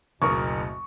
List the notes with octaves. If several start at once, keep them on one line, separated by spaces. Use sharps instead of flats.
F#1 D2 B2 A#4 C#6 D#6